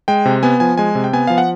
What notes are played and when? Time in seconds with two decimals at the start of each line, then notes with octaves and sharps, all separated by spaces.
0.08 G#3 G5
0.25 C3
0.43 B3 G#5
0.60 F3 G#5
0.78 G#3 G#5
0.95 C3
1.04 G5
1.13 B3 G#5
1.27 F3 F5
1.38 F#5